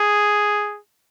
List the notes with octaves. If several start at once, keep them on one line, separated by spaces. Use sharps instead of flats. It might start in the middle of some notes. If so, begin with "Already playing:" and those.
Already playing: G#4